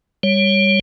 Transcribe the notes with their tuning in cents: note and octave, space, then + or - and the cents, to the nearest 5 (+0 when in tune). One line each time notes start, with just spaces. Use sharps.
G3 +20 C#5 +0